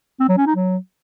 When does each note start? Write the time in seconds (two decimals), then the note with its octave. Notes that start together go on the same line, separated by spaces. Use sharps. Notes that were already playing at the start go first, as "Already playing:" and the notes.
0.20 C4
0.29 F#3
0.38 C#4
0.46 D#4
0.55 F#3